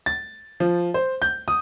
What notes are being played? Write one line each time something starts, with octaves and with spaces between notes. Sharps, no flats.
A6
F3
C5
G6
D#6